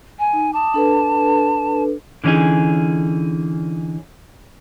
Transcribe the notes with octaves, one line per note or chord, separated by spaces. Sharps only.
G#5
D#4
A5 D6 D#6
D4 A4 B4
D3 E3 C#4 D#4 G#4